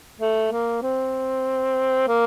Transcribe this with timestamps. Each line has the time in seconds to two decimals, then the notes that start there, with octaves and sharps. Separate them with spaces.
0.20 A3
0.52 A#3
0.83 C4
2.08 A#3